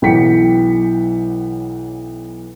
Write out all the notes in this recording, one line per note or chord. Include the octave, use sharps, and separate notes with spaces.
B1 E3 F#3 G5 B6 C#7